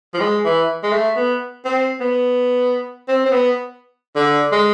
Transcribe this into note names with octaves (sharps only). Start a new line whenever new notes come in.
F3
G#3
E3
G#3
A3
B3
C4
B3
C4
C4
B3
D3
G#3